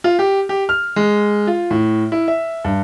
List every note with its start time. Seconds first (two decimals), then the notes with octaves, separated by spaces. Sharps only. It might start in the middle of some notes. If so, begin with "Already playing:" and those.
0.04 F4
0.19 G4
0.49 G4
0.69 F6
0.96 G#3
1.47 F4
1.71 A2
2.12 E4
2.28 E5
2.64 G2